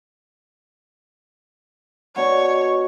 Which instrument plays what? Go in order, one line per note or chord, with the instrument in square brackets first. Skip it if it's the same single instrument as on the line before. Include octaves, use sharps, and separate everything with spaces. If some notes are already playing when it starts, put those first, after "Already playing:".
[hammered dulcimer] B2 D4 F#5 [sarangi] C#5